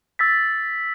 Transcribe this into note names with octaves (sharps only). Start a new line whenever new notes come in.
E6 A6 B6